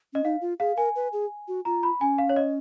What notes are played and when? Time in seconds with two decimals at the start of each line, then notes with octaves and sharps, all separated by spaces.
0.13 C#4 D#5
0.24 D#4 F5
0.41 F4
0.60 G#4 F5
0.77 A#4 G#5
0.96 B4
1.13 G#4
1.48 F#4
1.65 F4 A#5
1.83 B5
2.01 C#4 G#5
2.18 F5
2.29 C#5
2.36 D#5